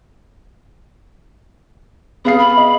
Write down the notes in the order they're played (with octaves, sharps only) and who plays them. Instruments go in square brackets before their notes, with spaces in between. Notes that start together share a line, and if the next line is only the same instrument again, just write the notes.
[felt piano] B3 F5 C7 [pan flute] G#4
[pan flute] B5
[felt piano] D#5